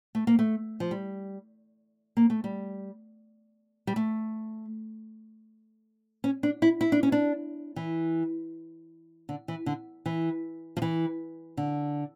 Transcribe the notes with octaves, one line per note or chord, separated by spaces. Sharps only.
A3
A#3
A3
F3
G3
A#3
A3
G3
G3
A3
C#4
D4
E4
E4
D4
C#4
D4
E3
D3
E3
D3
E3
F3
E3
D3